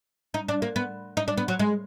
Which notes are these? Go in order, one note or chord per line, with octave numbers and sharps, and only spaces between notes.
D#4
D4
A#3
B3
D#4
D4
B3
F#3
G#3